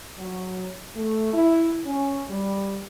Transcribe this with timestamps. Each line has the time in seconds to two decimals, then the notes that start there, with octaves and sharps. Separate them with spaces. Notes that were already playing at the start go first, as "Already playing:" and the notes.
0.19 F#3
0.94 A3
1.33 E4
1.86 C#4
2.29 G3